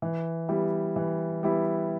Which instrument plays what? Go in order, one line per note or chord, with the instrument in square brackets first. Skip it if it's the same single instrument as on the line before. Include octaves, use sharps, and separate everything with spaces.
[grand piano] E3
G3 B3 E4 G4
E3
G3 B3 E4 G4